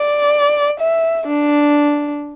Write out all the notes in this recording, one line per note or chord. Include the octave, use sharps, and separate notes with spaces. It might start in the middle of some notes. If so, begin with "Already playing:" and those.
Already playing: D5
E5
D4